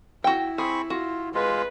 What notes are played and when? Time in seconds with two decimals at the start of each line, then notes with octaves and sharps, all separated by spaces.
0.24 E4 F#4 G5
0.58 C4 G#4 B5 C#6
0.90 F4 F#4
1.34 G#3 F4 B4